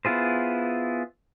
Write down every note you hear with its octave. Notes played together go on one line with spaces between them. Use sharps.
B3 E4 F4 G#4 C5